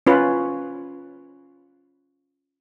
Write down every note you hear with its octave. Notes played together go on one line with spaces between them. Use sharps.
C#4 F4 B4